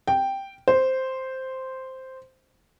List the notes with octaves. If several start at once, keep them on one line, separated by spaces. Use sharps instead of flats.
G5
C5